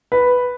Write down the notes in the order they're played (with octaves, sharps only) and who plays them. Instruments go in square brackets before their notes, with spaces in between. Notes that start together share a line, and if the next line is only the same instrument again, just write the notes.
[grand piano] B4